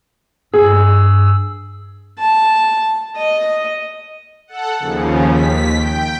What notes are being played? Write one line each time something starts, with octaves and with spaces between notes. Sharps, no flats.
G2 G#4 E6
A5
D#5
A4 F#5
D#2 C#3 F3
D#2 B6
G5